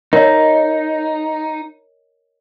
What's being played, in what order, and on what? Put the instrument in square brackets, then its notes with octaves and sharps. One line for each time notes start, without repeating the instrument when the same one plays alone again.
[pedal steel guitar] D#4 [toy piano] A#4 C#5 D#5